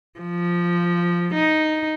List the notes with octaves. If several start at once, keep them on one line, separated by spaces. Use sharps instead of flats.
F3
D#4